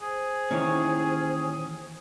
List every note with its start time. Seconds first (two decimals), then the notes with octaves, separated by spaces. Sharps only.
0.02 G#4 C5
0.51 A#2 D#3 E3 C#4 G4 C#5